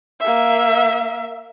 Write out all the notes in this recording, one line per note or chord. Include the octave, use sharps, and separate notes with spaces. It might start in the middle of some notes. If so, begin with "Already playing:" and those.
A#3 E5